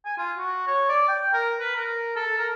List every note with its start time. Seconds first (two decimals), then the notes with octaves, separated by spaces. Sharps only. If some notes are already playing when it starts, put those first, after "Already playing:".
0.05 G#5
0.18 F4
0.38 F#4
0.67 C#5
0.89 D5
1.08 G5
1.33 A#4
1.59 B4
1.75 A#4
2.16 A4
2.38 A#4